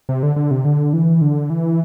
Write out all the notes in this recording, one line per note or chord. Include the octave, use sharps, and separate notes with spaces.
C3
D3
D3
C3
D3
E3
D3
E3